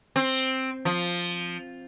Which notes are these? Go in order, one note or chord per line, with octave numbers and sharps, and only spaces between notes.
C4
F3